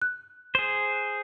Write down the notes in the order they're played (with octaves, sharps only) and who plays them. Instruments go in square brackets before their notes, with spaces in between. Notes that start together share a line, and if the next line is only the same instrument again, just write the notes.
[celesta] F#6
[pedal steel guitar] G#4 C5